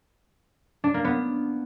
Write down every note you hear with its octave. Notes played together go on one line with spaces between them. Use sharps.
D4
A#3
B3